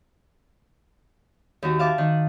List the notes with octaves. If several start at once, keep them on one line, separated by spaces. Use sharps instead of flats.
D#2 F#4
E5 F5 A5 D6
D#3